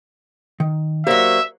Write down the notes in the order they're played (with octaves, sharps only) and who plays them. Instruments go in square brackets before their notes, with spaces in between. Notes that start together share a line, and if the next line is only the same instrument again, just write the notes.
[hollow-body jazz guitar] D#3
[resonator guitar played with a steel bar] F#3 A#3 [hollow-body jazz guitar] G4 C5 D5 [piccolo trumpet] E5